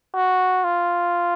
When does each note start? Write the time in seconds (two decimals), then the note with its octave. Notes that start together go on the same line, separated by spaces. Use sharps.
0.14 F#4
0.64 F4